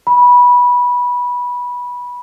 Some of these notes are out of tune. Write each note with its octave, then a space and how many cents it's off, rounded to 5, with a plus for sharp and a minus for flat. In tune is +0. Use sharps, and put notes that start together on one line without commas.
B5 -15